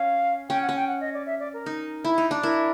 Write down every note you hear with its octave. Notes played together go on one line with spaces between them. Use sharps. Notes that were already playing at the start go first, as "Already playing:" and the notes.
Already playing: C#4 F5
C#4 G5
F#5
C#4
G5
F#5
D#5
D5
E5
D5
A#4
D#4
E4
D#4
D4
E4 A#4